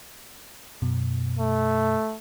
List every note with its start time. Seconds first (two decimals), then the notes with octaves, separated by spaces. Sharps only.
0.82 F#2 B2
1.37 A3